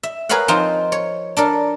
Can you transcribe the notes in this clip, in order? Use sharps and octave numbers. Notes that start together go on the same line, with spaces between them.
E5
G#4 A#4 B4 C#5 F5 F#5
F3 C4 D#4 F4
C#5
D4 A4 A#4